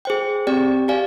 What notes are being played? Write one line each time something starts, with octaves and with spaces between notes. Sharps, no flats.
G#4 C5 G5
C4 G4 D5 G5
G4 D5 F5 G#5